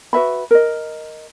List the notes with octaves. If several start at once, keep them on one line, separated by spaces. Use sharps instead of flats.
F#4 B4 E5 B5
A#4 D#5